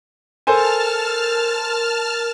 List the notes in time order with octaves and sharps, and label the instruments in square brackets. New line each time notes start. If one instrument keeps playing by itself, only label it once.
[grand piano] A4 C5 G#5 [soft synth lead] A#4 [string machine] A5 F6